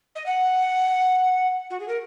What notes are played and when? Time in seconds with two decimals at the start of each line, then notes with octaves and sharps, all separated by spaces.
0.15 D#5
0.26 F#5
1.70 F#4
1.80 G#4
1.88 A#4